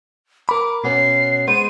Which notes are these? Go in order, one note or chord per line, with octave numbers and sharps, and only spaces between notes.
A#4 B5 D6
B2 B3 C#4 C7
G#3 B3 C5 D#7